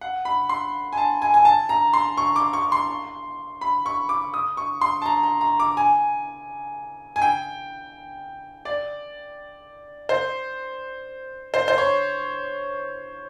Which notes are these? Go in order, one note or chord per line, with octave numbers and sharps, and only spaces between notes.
F#5
B5
C6
G#5
A5
G#5
G#5
A5
A#5
C6
C#6
D6
C#6
C6
B5
C#6
D6
D#6
C#6
C6
A5
A#5
A#5
A#5
D6
G#5
G#5
G5
D5
C5
C5
C5
C#5